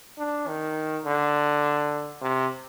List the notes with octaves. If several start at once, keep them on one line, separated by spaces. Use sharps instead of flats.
D4
D#3
D3
C3